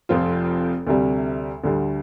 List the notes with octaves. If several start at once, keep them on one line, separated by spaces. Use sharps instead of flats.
F1 F2 F3 C4 F4
D2 C3 G3
D2 D3 G3